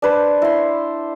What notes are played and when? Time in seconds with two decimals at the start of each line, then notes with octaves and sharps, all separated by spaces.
0.02 D4 B4 C5
0.42 E4 C6